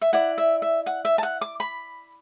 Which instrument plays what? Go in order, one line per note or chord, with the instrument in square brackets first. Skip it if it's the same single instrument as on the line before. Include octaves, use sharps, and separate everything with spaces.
[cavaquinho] E5
E4 D5 F#5
E5
E5
F#5
E5
A5
F#5
D6
B5